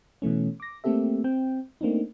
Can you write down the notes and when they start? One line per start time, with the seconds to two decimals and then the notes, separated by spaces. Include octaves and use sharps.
0.22 B2 E3 A3 C#4
0.60 D6 A#6
0.84 A3 A#3 C4 G4 A4 E5
1.24 C4 G5
1.81 A3 A#3 C4 D4 D#4